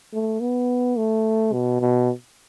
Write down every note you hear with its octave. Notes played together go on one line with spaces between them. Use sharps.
A3
B3
A3
B2
B2